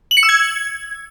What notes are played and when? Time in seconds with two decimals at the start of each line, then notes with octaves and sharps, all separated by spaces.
0.11 F#7
0.17 C#7
0.23 E6
0.29 G#6